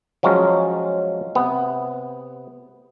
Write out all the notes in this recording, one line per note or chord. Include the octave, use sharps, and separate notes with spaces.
F3 F#3 G#3 C#4
C3 B3